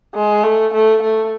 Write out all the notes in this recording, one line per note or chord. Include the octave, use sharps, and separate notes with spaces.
G#3
A3
A3
A3